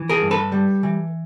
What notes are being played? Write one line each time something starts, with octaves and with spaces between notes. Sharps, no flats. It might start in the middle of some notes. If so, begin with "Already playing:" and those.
Already playing: E3
G#4 A#4
G2
A4 B4
G3
E3